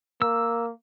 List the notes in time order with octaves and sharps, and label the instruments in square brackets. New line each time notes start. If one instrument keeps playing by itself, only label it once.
[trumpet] A#3 [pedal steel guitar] E6